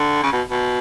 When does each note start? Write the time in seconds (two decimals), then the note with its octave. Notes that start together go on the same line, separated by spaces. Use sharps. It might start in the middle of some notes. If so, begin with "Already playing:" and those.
Already playing: D3
0.23 C#3
0.33 B2
0.50 B2